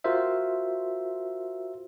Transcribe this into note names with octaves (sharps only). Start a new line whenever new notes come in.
F4 F#4 A#4 C5 E5